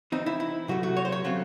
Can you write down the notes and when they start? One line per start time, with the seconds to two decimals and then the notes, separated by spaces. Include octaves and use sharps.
0.12 E3 C4 D#4
0.26 E4
0.40 E4
0.68 C3 F#3 A3 F#4
0.83 F#4
0.97 C#5
1.05 C5
1.12 C#5
1.24 C#3 F#3 A3 C4